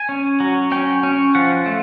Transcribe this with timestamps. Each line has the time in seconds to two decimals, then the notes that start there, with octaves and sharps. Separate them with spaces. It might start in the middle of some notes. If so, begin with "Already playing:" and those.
Already playing: G#5
0.09 C#4
0.40 F#3
0.71 C#4 G5
1.03 C#4
1.35 F3 F#5
1.66 A3